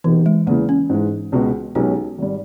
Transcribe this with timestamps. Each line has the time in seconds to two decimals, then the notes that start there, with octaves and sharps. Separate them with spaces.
0.04 B2 E3 A#3 D#4 G4
0.26 G#3
0.47 E2 C#3 E3 A#3
0.69 C#4
0.90 G#2 E3 G#3
1.32 C#2 B2 G#3
1.75 B1 B2 G#3 C#4 D#4 G4
2.18 G#1 G3